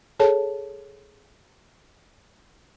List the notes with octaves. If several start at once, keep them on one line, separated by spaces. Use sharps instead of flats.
G#4 A4 C#5 A5